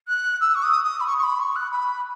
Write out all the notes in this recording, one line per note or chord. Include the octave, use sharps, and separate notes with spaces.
F#6
E6
C#6
D#6
D#6
B5
C#6
C#6
B5
C#6
F#6
B5